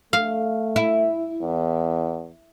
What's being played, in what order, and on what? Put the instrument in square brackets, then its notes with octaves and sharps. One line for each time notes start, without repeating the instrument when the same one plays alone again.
[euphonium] A3 [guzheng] F5
[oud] E4
[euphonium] E2